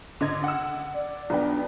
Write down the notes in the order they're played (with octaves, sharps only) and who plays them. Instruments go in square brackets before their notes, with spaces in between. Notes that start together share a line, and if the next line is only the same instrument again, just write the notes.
[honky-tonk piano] D3 D#5 G#6
F#5 E6
[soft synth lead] D5
[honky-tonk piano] B1 B3 G5 [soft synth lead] D4